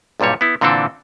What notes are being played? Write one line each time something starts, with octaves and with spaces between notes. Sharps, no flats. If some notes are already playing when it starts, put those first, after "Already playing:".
B1 G2 A#2 G3 C#5
B3 E4
A#2 D3 E3 C4 D4 A4